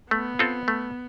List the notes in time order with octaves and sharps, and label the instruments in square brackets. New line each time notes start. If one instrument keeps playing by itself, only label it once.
[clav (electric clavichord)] A3 [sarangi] B3
[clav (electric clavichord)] C4 F4 A4
A3